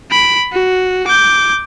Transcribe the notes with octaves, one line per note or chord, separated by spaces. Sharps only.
B5 D7
F#4
D6 G6